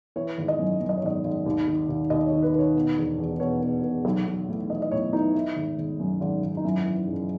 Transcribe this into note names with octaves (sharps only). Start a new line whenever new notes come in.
E3 C#5
G#1
D#5
F#2
F#2
D#5
C#5
G#1 D#5
G#1
D#2
D#3
D#2
D#2 D#5
C#5
D#3
B4
D#3
C#5
B2
E1
E2
B2 C#5
B2
B2
B1
B1
A2
E3 D#5
D#5
A2 C#5
E3 D#4
E3 E4
G#1
G#1
F#2
G#1
G#1
D#4
F#2 E4
E3
F#1